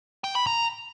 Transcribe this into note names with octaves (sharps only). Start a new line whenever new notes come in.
G5
B5
A#5